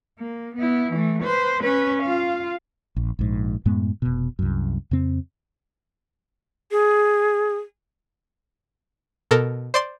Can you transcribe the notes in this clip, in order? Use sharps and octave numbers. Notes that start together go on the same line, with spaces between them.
A#3
B3 E4
E3 A3
B4 C5
C#4 B4
F4 F5
A#1
A#1 G#2
F#2 A2 G#3 B3
F1 B2
C2 F#2
F2 C#3 C4
G#4
B2 A4 A#4
C5 D5 C6